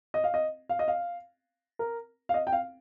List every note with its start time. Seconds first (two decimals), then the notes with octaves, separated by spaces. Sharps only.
0.14 D#5
0.24 F5
0.34 D#5
0.69 F5
0.79 D#5
0.88 F5
1.79 A#4
2.29 F5
2.34 D#5
2.47 G5
2.53 F5